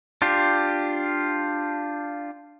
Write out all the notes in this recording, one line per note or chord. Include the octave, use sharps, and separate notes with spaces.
D4 F4 G4